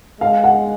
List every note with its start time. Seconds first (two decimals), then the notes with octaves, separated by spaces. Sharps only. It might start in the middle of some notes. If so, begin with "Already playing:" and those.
0.21 G#3 F5
0.44 F#5